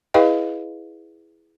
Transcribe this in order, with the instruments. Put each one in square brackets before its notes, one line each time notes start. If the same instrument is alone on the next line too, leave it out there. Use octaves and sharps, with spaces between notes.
[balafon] E4 G#4 B4 D#5 F5 G5